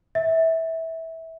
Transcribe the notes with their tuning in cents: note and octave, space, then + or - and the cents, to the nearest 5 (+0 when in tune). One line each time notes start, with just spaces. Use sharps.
E5 -20